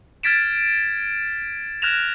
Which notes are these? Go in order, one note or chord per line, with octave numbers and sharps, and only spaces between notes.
F6 G#6 A6 B6 D7 E7
F6 F#6 G#6 A#6 E7 F7